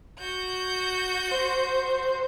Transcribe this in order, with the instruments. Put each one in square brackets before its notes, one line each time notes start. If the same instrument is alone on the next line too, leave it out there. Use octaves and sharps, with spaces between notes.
[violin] F#4 G6
[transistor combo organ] C5